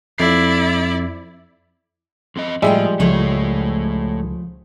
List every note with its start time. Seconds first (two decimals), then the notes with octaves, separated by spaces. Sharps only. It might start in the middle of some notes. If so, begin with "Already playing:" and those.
0.18 F2 E4 D5 C7
2.36 F2 C4 D#5
2.62 A2 F3 G3 G#3 G#4 E5 G5
3.00 C#2 F3 A3 G#4 A4 C5 C#5